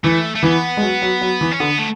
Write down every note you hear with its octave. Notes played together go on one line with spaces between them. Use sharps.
E3 A3
A3
E3 B3
G#3
F#3
F#3
F#3
E3
C#4
D3 B3
A3